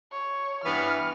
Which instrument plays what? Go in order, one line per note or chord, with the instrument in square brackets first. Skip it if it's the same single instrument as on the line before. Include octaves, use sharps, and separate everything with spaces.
[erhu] C#5
[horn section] G2 E3 B3 [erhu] F6